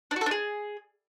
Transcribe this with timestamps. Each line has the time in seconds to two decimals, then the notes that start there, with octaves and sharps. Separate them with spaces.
0.11 D4
0.16 F#4
0.21 A4
0.26 D4
0.31 G#4